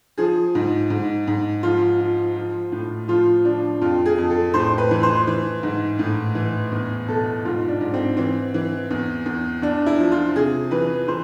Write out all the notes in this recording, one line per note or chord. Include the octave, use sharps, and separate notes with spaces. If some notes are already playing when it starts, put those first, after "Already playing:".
F3 G#4
G#2
G#2
G#2
F3 F4
F3
F3
A2
F3 F4
F3 D4
F2 F4
G#4
F2
A4
A2 C5
B4
E3
C5
E3
G#2
A2
E3
E2
B2 A4
G#2 F4
D4
G#2
C4
E3 C4
E3
E2
E2
E2 D4
E4
F3
F4
C3 G#4
E3 B4
E3 C5